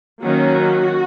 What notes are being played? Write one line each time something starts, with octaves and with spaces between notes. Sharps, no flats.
D#3 F#3 A#3 C#4 F#4